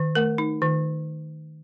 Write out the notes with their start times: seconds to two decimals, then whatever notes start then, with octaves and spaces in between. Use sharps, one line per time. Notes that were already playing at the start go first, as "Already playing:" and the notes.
Already playing: D#3
0.15 A3 A#4
0.38 D#4
0.62 D#3